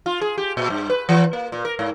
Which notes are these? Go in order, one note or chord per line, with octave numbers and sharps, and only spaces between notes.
F4
G#4
G4
A#2
G2
B4
E3
A#3
A#2
A#4
G#2